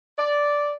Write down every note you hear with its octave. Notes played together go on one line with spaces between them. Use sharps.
D5